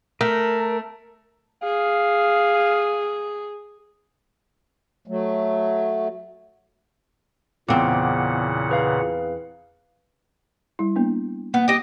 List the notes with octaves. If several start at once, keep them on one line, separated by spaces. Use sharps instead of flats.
A3 A#4
G#4 F5
F#3 A3
E2 A#2 C#3 B3 C4 F5 F#5 D6
G#4 B4 F5
G3 E4
A#3 B3 D4
A#3 B3
G4 D#5